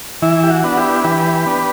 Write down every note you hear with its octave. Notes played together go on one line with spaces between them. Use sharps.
E3 E4
G4
F#4
B3 D4
E4 G4
E3 G4 B4
B3 D4